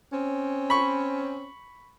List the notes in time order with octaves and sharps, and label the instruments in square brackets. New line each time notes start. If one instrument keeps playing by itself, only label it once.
[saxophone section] C4 C#4
[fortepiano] B5 C#6